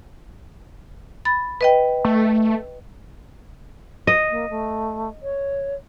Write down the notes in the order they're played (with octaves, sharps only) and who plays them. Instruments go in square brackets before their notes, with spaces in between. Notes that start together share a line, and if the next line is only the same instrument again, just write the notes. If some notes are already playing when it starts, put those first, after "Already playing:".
[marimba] B5 A6
B4 D#5 G5
[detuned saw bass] A3
[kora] D#5
[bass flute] A#3
A3
C#5